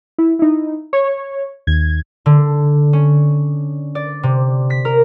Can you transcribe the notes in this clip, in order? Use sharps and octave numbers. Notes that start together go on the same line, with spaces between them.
E4
D#4 E4
C#5
D#2 G#6
D3
C#4
D5
C3
B6
A#4